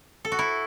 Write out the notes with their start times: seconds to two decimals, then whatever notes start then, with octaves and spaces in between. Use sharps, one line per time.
0.25 A4
0.32 F#4
0.39 E4